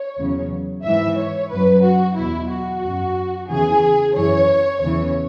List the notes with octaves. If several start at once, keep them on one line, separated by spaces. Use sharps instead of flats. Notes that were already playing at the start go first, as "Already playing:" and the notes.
Already playing: C#5
E2 C#3 F#3
G#2 E3 E5
C#5
F#2 F#3 B4
F#4
E2 B2 F#3 E4
F#4
F#2 F#3
E2 C#3 E3 G#4
F#2 E3 C#5
E2 C#3 E3 C#5